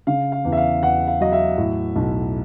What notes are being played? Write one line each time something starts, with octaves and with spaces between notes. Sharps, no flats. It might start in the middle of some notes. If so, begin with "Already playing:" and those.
C#3 F5
F5
E2
E5
F5
E2 F#5
F5
F#3 D#5
E5
A2
B1